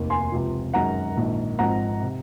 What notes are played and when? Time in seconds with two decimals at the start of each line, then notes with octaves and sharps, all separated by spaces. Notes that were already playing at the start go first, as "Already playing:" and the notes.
Already playing: F1 D#2 D#3 A#3
0.10 G#5 C6
0.32 C#2 C3 F3
0.73 F#2 D#3 G#3 C#4 F#5 A#5
1.17 A#1 G#2 D#3
1.58 G#1 G#2 F3 C4 D#4 F#5 A#5
2.01 C3